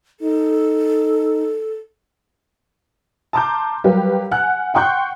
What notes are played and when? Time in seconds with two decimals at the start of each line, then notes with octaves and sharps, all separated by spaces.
0.20 D#4 A4
3.33 A5 A#5 C6 D6 F6 G6
3.84 F#3 G3 G4 A#4 B4 F5
4.31 F#5 G#5 F6 F#6
4.74 F#5 G5 C6 C#6 F#6 G6